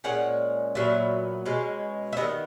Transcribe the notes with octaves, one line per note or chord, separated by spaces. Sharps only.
A#2 G#3 C#4 F#5
A#2 F#3 B3 E5
B2 G#3 C#4
E5
D#3 G#3 B3 D#5